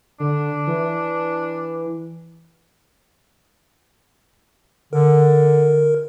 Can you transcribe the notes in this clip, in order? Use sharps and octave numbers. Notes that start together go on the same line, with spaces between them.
D3 D4
E3
D3 A#4